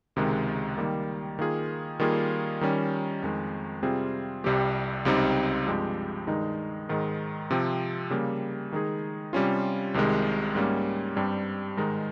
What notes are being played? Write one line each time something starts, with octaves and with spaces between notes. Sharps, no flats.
C#2 C3 D#3 G#3
D#3 G3 A#3
D#3 A#3 F4 G#4
D#3 G3 A#3 F4 G#4
D#3 G3 C#4
F2 D#3 G#3
C3 G3 C4 F4 G#4
C2 C3 G3 C4 G4
C#2 C3 G3 C4 D#4
G2 F3 G#3 C4 G4
G2 D#3 G#3 D#4
G#2 D#3 G#3
C3 F3 C4
C#3 G3 A#3
D#3 G#3 D#4 G#4
C3 G3 C#4 F4
C2 C3 D#3 G#3
G#2 G3 A#3 C#4
G2 G3 C4 G4
G#2 D#3 G#3 D#4